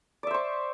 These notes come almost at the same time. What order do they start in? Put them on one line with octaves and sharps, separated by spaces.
D5 E5 C5 C#6